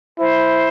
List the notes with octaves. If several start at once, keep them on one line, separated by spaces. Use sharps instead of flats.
E4 C5